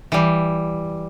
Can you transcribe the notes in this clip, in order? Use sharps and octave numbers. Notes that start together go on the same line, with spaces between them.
E3 G3